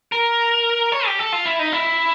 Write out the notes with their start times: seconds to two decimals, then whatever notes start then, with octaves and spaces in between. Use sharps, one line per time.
0.12 A#4
0.92 C#5
1.06 G4
1.19 A4
1.32 F4
1.46 E4
1.59 D#4
1.73 E4